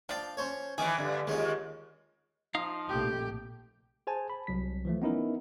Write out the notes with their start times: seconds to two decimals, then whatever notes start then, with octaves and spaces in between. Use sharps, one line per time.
0.09 F3 D4 D5 F5 G5
0.37 C#4 C5 C#5
0.78 D#3 E3 G#4 E5 D6
0.98 G2 D3
1.27 D#2 G#3 C#4 F4
2.55 F3 D#4 F5
2.89 A#1 C3 A3 G4
4.07 G#4 C5 G#5 A5
4.30 B5
4.47 C2 F#3 B6
4.85 E3 F3 A3
5.02 B3 C#4 D#4 E4 A#4